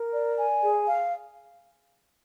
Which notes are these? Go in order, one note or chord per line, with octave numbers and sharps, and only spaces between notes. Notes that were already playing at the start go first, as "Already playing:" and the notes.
Already playing: A#4
D5
G#5
G#4
F5